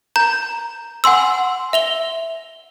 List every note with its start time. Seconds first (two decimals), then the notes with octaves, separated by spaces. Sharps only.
0.16 A#5 G6
1.04 F#5 G#5 C6 E6
1.73 E5 F7 G7